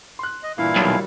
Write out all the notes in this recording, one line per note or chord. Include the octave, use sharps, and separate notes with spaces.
C6 F#6
D#5
G2 A#2 E3 E4 F5
B1 D#3 F#3 G3